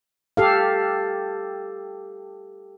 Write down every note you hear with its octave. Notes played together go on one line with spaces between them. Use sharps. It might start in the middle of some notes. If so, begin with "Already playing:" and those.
G4 A4 F5